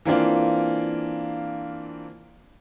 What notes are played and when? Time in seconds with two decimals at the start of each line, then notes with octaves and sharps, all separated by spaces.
0.05 E3 A#3 C4 D4 F4